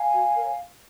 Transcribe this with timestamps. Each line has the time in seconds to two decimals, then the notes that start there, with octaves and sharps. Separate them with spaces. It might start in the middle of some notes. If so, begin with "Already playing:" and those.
Already playing: F5 G#5
0.13 F#4
0.35 A#4 C#5